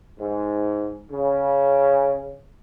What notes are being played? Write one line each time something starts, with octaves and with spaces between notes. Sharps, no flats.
G#2
C#3